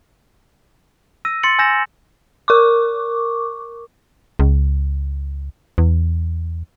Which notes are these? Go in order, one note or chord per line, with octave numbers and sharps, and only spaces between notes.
E6 A#6 D#7
C6 A6 C#7 F#7
G#5 E6 G6 A6 A#6 E7
A#4 C#6 D6
C#2
E2